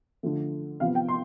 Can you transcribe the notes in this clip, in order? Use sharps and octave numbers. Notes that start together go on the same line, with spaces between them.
D3 F3 A3
C3 F3 B3 F5
G5
C6